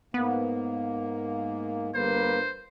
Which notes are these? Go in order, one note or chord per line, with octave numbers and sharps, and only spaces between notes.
G#2 A#3 B3
G1 A#3 B4 C5